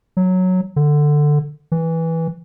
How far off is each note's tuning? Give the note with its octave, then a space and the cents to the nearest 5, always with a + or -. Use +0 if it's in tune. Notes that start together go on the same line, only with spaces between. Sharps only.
F#3 -5
D3 +10
E3 -10